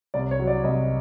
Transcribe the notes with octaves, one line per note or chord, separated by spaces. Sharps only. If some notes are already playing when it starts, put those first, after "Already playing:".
C2 D5
C#5
F#3
D5
C2 D#5